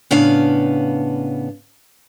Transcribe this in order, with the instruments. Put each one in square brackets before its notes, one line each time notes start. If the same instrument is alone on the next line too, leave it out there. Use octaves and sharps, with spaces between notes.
[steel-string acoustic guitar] A2 C#3 B3 D4 F5